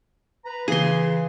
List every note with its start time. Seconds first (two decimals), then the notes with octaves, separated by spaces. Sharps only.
0.45 B4 A#5
0.68 C#3 E3 G#4 C6